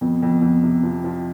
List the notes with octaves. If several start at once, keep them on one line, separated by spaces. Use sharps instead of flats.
F2 B3
F2
F2
C3
F3
F3